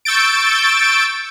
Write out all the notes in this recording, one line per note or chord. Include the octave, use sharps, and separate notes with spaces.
C#6 E6 G6 A6 D7